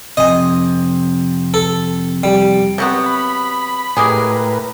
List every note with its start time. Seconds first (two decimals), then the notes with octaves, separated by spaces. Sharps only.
0.17 F2 C3 D#5 G#5
1.54 A4
2.23 G3
2.78 C3 F#3 B3
3.06 B5
3.97 A2 G#3 G4 G#4 A#4 B4